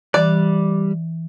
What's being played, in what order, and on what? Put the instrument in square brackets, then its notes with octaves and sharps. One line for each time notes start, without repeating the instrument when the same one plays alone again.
[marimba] E3 [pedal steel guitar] G3 F#6 [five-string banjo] D5